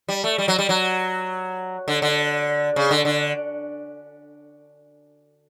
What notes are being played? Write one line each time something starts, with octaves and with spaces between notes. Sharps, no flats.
G3
A3
G3
F#3
G3
F#3
D3
D3
C#3
D3
D3